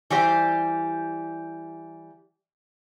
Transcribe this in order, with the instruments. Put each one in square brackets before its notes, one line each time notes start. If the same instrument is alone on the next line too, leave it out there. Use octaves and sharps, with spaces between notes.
[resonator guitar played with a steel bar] E3 G3 G4 C5